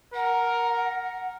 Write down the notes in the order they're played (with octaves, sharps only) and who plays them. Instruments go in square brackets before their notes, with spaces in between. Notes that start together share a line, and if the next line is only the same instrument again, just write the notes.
[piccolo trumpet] A#4 [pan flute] F#5